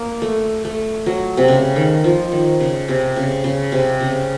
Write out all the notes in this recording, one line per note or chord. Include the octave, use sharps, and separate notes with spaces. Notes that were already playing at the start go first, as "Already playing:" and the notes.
Already playing: A#3
A3
A3
F#3
C3
C#3
D#3
F3
D#3
C#3
C3
C#3
C#3
C3
C#3